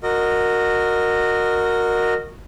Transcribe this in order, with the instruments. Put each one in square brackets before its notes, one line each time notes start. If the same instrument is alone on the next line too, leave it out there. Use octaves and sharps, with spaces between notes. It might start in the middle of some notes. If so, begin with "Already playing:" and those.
[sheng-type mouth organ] F#4 A#4 D#5